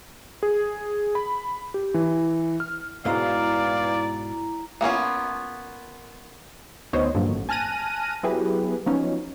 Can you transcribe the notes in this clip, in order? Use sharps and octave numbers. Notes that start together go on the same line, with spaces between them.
G#4
B5
G4
E3
F6
G#2 B2 E3 G#3 E4 D5 F5 A#5
A#3 B3 C#4 F4
D2 D#3 B3 C5 C#5 D#5
G2 A#2 D3 F3 F#3
A1
G#5 A5 F6 F#6 A#6 D#7
F#3 B3 E4 G4 G#4 B4
F3 F#3 B3 C#4 D#4